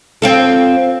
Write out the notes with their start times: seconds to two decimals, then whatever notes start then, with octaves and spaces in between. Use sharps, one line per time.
0.22 C4 F4 A4